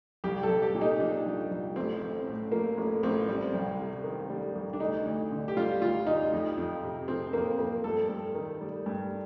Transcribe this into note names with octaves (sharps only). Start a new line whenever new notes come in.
C2 G4
A4
C2
G4
A#2
D#4
F3 D4
C2
C2
A1 C4
A1
A2
F3 A#3
A1
A1 C4
G3
C2
C3
D#3
G3
C2
D4
D2 D#4
D2
D3
G4
G3 F4
D2 F4
D2 D#4
F2
F2
C3
F3 C4
F2 A#3
F2 A#3
G2 A4
G2
D#3
G3
G2